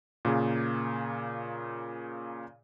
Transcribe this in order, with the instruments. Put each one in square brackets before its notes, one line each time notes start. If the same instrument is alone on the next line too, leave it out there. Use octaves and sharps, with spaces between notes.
[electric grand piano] A#2 C#3 A#3 G#4